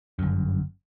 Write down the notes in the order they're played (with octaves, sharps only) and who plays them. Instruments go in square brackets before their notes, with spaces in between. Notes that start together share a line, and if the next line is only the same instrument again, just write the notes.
[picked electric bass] G1 F#2